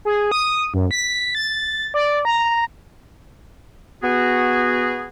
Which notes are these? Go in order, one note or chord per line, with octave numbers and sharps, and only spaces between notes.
G#4
D#6
F#2
B6
A6
D5
A#5
B3 F#4 G#4